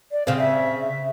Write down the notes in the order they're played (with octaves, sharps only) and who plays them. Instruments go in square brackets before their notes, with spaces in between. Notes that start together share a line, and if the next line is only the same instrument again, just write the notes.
[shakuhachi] D5
[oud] C#3 C4 [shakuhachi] F5
[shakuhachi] E5